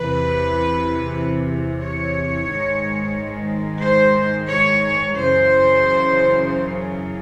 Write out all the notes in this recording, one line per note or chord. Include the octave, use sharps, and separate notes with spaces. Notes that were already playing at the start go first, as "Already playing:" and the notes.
Already playing: E2 C3 E3 B4
C#5
G#2 D#3 G#3
C5
C#5
F#2 C#3 E3 C5